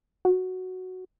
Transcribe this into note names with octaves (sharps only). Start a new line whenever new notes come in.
F#4